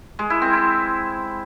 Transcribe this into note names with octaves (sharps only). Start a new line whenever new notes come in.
G#3
E4
C4
E4